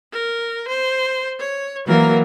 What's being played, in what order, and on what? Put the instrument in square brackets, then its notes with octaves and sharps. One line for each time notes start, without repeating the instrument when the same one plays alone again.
[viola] A#4
C5
C#5
[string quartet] E3 F#3 A#3 [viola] A#4